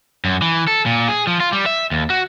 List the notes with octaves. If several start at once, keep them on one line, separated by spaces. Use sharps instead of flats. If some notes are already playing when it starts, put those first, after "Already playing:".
F#2
E3
A4
A#2
G#4
F3
F4
G3
E5
D#2
F#4